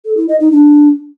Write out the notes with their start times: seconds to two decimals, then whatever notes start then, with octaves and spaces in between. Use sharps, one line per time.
0.05 A4
0.17 E4
0.29 D#5
0.40 D#4
0.52 D4